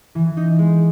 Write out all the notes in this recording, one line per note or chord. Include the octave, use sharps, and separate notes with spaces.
E3
D#4
G#3